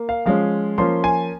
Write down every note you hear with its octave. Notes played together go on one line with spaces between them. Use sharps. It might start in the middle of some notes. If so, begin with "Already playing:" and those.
Already playing: A#3
F5
F3 G#3 C#4 F5
F3 A#3 C#4 C6
G#5